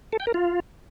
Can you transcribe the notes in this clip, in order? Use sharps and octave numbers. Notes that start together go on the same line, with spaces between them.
A4
G5
A#4
F4